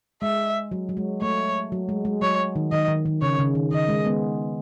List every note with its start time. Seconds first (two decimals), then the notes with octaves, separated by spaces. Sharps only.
0.22 G#3 E5
0.71 F#3
0.89 F#3
0.97 G#3
1.22 A3 C#5
1.72 F#3
1.89 G#3
2.05 G#3
2.22 F#3 C#5
2.56 D#3
2.72 D#3 D#5
2.88 D#3
3.06 D#3
3.22 C#3 C#5
3.39 C#3
3.55 D#3
3.72 D#3 D#5
3.88 G#3
4.06 G#3 B3